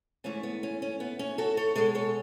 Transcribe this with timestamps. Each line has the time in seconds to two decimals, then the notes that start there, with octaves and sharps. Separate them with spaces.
0.24 G#2 E3 A3 C#4
0.43 B3
0.63 C#4
0.82 C#4
1.00 B3
1.19 C#4
1.38 F#4 A4
1.57 A4 C#5
1.76 B2 G#3 A4 C#5
1.95 A4 C#5